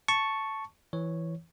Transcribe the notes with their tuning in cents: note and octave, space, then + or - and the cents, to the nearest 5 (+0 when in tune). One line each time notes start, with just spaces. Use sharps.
A5 +0 C#6 +0
E3 +0 C#5 -5